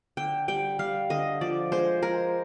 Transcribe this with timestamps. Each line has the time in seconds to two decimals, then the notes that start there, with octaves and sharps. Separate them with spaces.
0.17 D3 G5
0.48 G3 G5
0.79 G3 F5
1.10 D3 D#5
1.41 F3 D5
1.72 G#3 C5
2.02 G#3 A#4